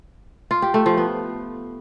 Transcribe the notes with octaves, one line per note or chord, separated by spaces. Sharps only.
F4
G4
A3
F3
B3